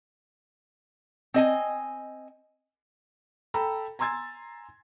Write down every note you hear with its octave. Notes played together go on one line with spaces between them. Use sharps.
C4 D#5 G#5
A4 G5 A#5 B5
G#5 A#5 C6 E6 G#6 A6